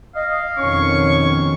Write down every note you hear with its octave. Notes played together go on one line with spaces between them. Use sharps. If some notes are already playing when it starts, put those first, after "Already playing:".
D#5 F5
F2 B2 D#3 C#4 C#5 C#6